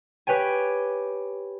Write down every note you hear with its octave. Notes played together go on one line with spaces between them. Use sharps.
G4 B4 C#5 G5 G#5